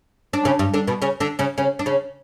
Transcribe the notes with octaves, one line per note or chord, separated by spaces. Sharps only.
D4
C#3 C#4
G2 G3
D3 D4
B2 B3
C#3 C#4
D3 D4
C#3 C#4
C#3 C#4
D4
C#3 C#4